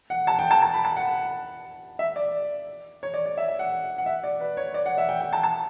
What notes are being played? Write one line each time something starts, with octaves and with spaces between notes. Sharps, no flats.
F#5
A5
G5
A5
A5
B5
A5
F#5
E5
D5
C#5
D5
D5
E5
E5
F#5
F#5
E5
D5
B4
C#5
D5
F#5
E5
G5
G5
A5
A5